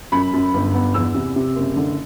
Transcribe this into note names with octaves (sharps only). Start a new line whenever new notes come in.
F#2 B5
F#2
G1
B3
E2 E6
C3
C3
F#1
D3